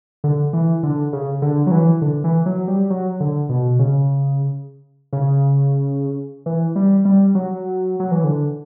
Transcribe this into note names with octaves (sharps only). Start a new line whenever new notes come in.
D3
E3
D3
C#3
D3
F#3
E3
D3
E3
F#3
G3
F#3
D3
B2
C#3
C#3
E3
G3
G3
F#3
F#3
E3
D3